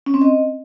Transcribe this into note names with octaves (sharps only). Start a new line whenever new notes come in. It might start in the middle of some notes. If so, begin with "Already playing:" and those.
C#4
C4
D#5